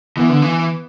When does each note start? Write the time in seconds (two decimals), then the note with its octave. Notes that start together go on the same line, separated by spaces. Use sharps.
0.17 E3 B3
0.29 D3
0.42 E3